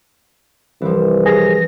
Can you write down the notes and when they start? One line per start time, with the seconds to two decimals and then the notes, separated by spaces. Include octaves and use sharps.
0.82 C2 E3 F3
1.26 G#4 A#6